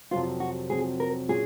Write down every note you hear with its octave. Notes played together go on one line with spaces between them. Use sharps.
F2 C3 F#3 C4 F4
F#4
F2 C3 F#3 C4 G#4
A#4
A#2 F#3 C#4 F#4 G#4